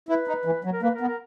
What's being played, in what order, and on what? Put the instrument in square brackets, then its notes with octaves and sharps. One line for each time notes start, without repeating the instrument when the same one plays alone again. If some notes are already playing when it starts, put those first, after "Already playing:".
[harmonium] E4 [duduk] B4
[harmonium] D#4
E3
F#3
[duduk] A#4
[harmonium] A#3 [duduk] B4
[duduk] A#4
[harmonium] B3
[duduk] A#4